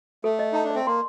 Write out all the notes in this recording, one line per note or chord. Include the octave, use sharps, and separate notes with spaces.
A3 A4
D#5
D#4 A5
D4
C4 D5
A#3 C6